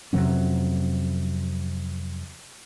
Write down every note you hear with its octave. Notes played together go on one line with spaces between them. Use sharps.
F2 C3 F#3 C#4